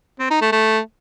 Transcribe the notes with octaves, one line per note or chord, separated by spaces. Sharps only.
C4
D#4
A3
A3